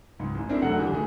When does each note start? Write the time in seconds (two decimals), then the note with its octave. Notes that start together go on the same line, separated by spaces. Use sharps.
0.19 C#2 G#2
0.35 A1
0.49 C4 D4 E4 A#4
0.62 E1 F#3 A3 A4 F#5
0.77 D3 E3 G3 A#3
0.91 D1 D#3 A3 G#4